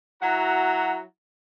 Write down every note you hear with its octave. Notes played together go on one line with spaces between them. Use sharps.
F#3 E4 F#4 F#5 A#5